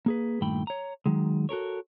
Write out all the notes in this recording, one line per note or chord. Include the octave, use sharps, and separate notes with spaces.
A#3 G#4 B4
G2 A#2 D#3 A3 G5 B5
C#5 A#5
D#3 F#3 G#3
F#4 A4 A#4 C#5